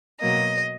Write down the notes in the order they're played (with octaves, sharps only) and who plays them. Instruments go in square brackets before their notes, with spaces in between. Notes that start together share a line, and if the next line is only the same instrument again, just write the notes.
[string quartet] B2 F#3 A#3 D#5